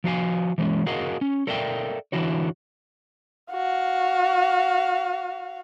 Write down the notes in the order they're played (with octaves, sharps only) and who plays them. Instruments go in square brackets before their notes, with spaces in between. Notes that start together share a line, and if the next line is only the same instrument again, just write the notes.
[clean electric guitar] F3 F#4 F5 G#5
E3 G#3 A3 C#4
F#4 G#4 A#4 D#5 F5 F#5
C#4
A4 A#4 D5 E5 F5 G5
D3 E3 E4 F#4 C#5
[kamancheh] F#4 F5